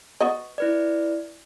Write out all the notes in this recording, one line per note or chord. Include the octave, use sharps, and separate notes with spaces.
B3 F#4 D#5
E4 B4 D5